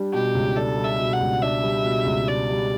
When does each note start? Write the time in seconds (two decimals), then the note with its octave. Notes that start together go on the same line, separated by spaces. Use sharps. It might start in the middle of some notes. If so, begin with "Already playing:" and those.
Already playing: G3 D4
0.13 B2 G4
0.35 C#2
0.56 D4 A4
0.77 G3
0.84 E5
1.00 B2
1.13 F#5
1.20 C#2
1.42 D4 E5
1.63 G3
1.84 B2
2.06 C#2
2.28 D4 D5
2.50 G3